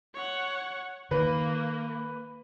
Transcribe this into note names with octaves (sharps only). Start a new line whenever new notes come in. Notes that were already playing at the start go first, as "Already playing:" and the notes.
C#5 F#5
D#3 A#3 B4